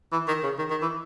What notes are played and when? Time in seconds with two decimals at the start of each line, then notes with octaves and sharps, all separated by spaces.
0.12 E3
0.28 D#3
0.43 C#3
0.59 D#3
0.71 D#3
0.82 E3